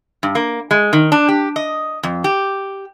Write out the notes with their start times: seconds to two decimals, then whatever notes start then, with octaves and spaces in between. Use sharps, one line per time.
0.23 G2
0.35 A#3
0.71 G#3
0.93 D#3
1.12 D4
1.28 G4
1.56 D#5
2.03 F2
2.24 G4